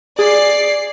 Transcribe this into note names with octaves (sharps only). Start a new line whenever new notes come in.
G#4 D5 C7